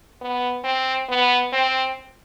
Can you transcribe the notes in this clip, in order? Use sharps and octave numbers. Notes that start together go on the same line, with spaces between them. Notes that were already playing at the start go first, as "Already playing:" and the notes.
B3
C4
B3
C4